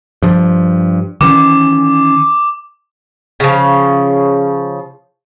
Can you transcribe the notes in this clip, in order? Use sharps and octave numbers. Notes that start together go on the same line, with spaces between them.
G2 F3
D#3 E3 C#4 D6
C#3 F3